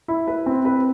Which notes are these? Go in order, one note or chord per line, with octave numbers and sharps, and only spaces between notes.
E4
B4
C4
B4